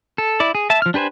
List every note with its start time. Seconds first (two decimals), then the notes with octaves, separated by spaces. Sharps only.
0.18 A4
0.40 E4 D5
0.55 G#4
0.70 E5 A5
0.82 F3 F6
0.94 D4 G4 B4 C5 G#5